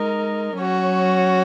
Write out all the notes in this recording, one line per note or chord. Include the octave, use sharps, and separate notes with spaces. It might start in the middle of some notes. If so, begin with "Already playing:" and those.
Already playing: G#3 D#4 A#4
F#3 C#4 F#4 C#5